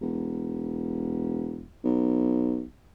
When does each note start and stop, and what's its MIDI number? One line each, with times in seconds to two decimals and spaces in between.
0.01 1.71 28
1.84 2.64 35